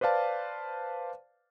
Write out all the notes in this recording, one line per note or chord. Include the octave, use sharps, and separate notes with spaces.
B4 C5 D5 F5 A5